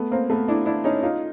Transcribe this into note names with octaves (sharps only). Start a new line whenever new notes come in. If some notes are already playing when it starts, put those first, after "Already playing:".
Already playing: A3 B3
A#3 C4
A3 B3
D4 E4
D4 E4
C#4 D#4
D#4 F4